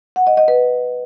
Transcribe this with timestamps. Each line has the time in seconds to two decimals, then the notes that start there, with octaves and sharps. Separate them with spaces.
0.16 F#5
0.27 D#5
0.37 D#5
0.48 B4